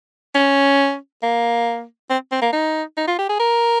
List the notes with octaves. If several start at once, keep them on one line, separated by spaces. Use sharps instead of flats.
C#4
A#3
C4
C4
A#3
D#4
D#4
F4
G4
G#4
A#4